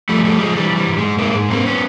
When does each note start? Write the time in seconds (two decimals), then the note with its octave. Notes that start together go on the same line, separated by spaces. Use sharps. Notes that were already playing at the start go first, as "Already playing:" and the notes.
0.09 F3 G3 A3
0.24 F3 G3 A3
0.40 F3 G#3
0.56 E3 G3
0.72 E3 G3
0.88 G#2
0.98 G#2 G#3
1.18 D#3 G#3 A#3
1.34 G#2 G#3
1.50 G#2 A#3 C4
1.66 B3 C#4